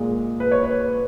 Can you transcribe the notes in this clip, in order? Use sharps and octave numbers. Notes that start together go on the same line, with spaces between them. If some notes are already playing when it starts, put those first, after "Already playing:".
Already playing: A#2 G#3
B4
C#5
B4